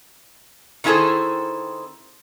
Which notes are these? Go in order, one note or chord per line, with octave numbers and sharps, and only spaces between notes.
D#3 C4 E4 G#4 A4 C5